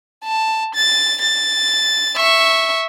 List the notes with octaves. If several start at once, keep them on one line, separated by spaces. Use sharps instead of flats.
A5
A6
A6
E5 C#6